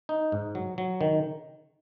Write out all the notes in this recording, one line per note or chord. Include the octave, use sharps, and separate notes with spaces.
D#4
G#2
F#3
F#3
D#3